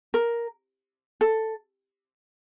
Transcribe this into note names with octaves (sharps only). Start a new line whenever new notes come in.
A#4
A4